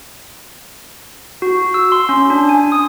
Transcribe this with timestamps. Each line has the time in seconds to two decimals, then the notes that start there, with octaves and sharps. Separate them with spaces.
1.42 F#4
1.74 E6
1.92 C6
2.09 C#4
2.30 D4
2.49 G#5
2.72 D#6